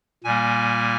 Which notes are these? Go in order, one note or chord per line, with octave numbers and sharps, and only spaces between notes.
A#2 G3 A#3 G#5